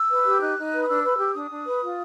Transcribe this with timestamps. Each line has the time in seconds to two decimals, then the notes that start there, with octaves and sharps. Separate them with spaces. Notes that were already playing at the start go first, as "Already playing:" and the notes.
Already playing: E6
0.10 B4
0.25 G4
0.40 D#4 F#6
0.56 D#4
0.73 B4
0.83 D#6
0.88 D4 E6
1.04 B4
1.18 G4
1.35 D4 D#6
1.50 D4
1.65 B4
1.82 F4